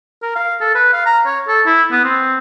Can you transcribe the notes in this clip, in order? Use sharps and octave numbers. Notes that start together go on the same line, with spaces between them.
A#4
F5
A4
B4
F5
A#5
C#5
A4
E4
B3
C4